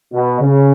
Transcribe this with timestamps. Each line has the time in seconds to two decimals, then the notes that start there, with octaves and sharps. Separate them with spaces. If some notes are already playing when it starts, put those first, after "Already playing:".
0.13 B2
0.41 C#3